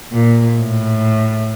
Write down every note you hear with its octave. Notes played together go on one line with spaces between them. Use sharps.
A#2
A2